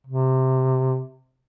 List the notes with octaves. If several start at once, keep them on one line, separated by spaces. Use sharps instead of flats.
C3